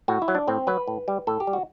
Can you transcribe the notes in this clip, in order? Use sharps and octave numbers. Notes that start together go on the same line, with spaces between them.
A2 F#4
E4
F#3
D4
A2 C4
F#3 B4
A2
G3
A2 A4
G4
G3
F#4